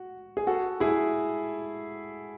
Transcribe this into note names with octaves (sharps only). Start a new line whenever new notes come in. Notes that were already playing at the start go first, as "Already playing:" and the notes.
Already playing: F#4
G#4
F#4 A4
E4 G#4